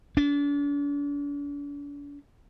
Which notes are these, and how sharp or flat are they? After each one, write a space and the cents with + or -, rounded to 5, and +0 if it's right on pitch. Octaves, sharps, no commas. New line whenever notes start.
D4 -40